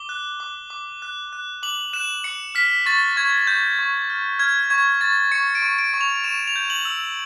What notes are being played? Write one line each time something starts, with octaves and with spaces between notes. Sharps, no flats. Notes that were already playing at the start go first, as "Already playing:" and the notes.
Already playing: D6 G7
F#6
D6
D6
F#6
F#6
D6 F#7
F#6 E7
D6 C#7
F6 B6
C#6 A6
C#6 G#6
C#6 G6
C#6
F6
F6 G#6
C#6 G#6
C#6 A6
C#6 C#7
D7
C#6
D7
C#6
F7
C#6 E7
F7
G6
F#7
E6